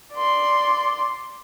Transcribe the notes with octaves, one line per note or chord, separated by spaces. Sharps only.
D5 C6